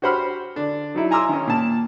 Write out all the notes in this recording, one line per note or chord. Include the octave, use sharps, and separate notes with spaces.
F#4 G4 C5 F#5 B5 F6
D3 D4
F#3 D#4 E4
G#5 A#5 C6 D6 E6
D#3 C#4
A#2 A5